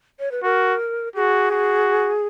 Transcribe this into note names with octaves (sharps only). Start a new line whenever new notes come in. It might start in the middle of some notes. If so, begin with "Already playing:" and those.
C#5
B4
F#4 A#4
F#4 G#4
F#4